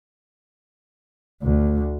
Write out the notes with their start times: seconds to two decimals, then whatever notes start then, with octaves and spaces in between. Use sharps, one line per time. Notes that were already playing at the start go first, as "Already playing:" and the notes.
1.43 D2